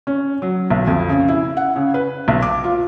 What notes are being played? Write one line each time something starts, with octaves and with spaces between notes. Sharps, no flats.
C#4
F#3
B1
F2
C#3
E4
F#5
C#3
B4
B1
D6
F4